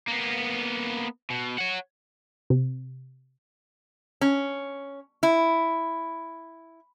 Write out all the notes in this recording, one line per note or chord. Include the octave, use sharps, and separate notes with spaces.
A#3 B3
B2
C#5 F#5
C3
C#4
E4